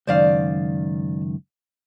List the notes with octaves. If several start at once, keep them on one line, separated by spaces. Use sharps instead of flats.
C#2 F#2 D#3 C5 D5 F5